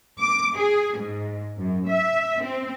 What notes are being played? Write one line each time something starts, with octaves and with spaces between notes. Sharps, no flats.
D6
G#4
G#2
F#2
E5
C4